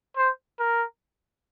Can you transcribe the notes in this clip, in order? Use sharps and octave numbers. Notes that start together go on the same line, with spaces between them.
C5
A#4